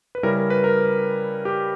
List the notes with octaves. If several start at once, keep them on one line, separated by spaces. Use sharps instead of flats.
B4
C#3 G3 C#4 E4 A#4
A#4
B4
A#4
G4